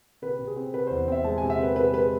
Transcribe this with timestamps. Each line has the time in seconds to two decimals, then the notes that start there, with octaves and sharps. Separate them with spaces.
0.22 C3 B4
0.39 C3
0.47 G#4
0.56 C4
0.73 C3 B4
0.87 E2 C5
1.08 C4 E5
1.24 G#3 A5
1.38 C3 G#5
1.50 E5
1.59 C4 B4
1.76 C3 B4
1.93 G#3 B4